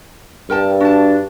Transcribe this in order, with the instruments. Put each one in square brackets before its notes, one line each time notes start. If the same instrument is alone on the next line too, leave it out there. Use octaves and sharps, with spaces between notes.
[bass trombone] G2 [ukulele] A#4 G5 A5
[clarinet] D4 [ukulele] F#4 A5